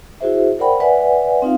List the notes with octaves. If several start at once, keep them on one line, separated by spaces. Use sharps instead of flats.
E4 F#4 G#4 C5 E5
A#4 C5 D5 F#5 G5 B5
B4 D5 E5 F#5 G#5
C4 D#4 F4 F5